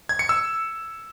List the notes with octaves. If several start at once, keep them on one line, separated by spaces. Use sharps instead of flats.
G#6
C#7
E6